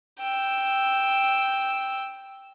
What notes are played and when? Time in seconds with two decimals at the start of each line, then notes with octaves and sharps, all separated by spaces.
0.19 G5 E6